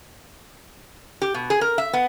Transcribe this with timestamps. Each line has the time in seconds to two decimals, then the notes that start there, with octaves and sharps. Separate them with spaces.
1.22 G4
1.34 B2
1.50 G#4
1.61 A#4
1.78 E5
1.93 B3